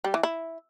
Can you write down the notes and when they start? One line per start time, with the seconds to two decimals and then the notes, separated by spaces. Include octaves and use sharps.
0.04 G3
0.14 E3
0.23 E4